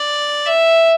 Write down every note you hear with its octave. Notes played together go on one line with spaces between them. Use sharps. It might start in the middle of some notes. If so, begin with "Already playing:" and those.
Already playing: D5
E5